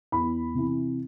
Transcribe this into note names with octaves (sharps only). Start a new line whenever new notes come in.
E2 B5
C3 E3